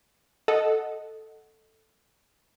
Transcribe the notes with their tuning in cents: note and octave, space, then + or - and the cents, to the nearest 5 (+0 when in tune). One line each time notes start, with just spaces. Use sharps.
A4 +0 D#5 +0 F#5 +0